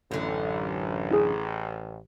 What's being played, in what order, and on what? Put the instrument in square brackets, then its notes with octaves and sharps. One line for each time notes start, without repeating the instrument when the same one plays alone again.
[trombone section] A1 [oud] F#2 D3
[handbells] E4 G#4